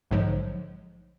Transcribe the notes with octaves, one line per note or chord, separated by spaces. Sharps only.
A#1 G#2 D3 F3 F#3 G#3